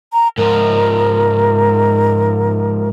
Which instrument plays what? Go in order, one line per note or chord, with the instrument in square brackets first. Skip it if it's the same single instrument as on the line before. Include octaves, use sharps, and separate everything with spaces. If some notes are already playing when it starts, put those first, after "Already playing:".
[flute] A#5
[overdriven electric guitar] G#2 F3 [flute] A#4